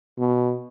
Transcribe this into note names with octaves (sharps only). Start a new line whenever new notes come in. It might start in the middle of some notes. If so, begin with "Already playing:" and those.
B2